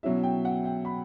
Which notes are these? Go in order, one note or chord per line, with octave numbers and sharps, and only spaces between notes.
B2 F#3 C#4 E4 E5
G5
F#5
G5
B5